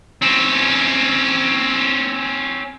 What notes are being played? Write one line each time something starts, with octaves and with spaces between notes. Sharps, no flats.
C4 C#4